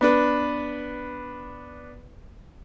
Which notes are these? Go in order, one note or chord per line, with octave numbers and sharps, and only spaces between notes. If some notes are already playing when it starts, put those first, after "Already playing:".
B3 D4 B4